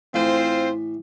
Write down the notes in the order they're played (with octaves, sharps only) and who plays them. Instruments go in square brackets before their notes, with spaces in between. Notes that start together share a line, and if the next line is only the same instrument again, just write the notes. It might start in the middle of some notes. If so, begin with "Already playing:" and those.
[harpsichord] A2 E3 [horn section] C4 F4 C5